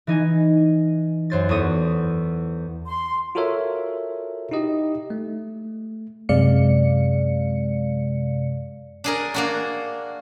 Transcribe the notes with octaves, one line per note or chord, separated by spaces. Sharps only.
E3 D#4 G#5
F#2 C5 A6
E2 A4 C#6 D#6
C6
F4 F#4 A4 A#4 C#5 E5
D#4 E4 G4 D#5
A3
F#2 C3 G#3 D5 F5 C#7
D4 G#4 A#4
A#3 D4 F#4